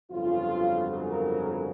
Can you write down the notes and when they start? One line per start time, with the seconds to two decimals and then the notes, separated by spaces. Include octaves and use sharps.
0.11 G1 F2 C#3 F#3 F4
1.08 A#4